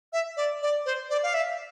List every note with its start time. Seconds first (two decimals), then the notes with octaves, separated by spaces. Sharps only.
0.13 E5
0.37 D5
0.62 D5
0.86 C5
1.10 D5
1.23 F5
1.34 E5